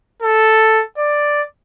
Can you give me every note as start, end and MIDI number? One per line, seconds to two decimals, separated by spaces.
0.22 0.83 69
0.98 1.42 74